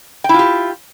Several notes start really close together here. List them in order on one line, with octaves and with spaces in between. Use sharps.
G5 E4 F4 G4